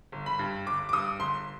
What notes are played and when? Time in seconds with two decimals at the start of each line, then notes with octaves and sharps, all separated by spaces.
0.12 G1
0.26 B5
0.39 G2
0.66 G1 D6
0.89 D6
0.93 G2 D#6
1.20 G1 C6